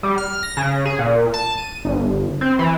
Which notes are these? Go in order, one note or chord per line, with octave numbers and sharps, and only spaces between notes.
G3
F6
A#6
C#3
G#4
A#2
A5
D#7
G1
C4
E3